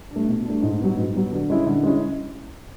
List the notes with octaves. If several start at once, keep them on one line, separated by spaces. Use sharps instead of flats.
D4
A3
B2
A3 D4
G#2
F#3 B3
G#2
F#3 B3
D3
G#3 C#4 E4
D3
G#3 C#4 E4